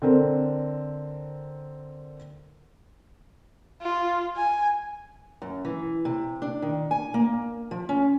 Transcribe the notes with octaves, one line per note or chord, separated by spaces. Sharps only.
D3 C4 A#4
F4
G#5
F#2
E3
C3
D4
D#3
G#5
A#3
F3
C#4